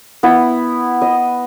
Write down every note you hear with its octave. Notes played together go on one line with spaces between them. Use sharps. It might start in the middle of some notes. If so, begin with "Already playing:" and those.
B3 E4
D#5